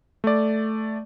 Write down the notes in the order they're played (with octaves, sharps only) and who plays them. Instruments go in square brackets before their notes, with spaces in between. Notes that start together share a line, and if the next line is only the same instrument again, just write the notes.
[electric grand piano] A3 D5